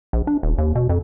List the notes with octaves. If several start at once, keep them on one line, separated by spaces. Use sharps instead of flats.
A#1
D4
D#1
D#2
B2
F2